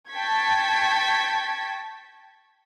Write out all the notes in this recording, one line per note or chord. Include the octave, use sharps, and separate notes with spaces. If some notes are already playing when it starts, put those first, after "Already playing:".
G5 A5 C#6 G#6 B6